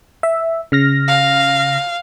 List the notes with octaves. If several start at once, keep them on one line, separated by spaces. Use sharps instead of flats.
E5
C#3 F6 A#6
F5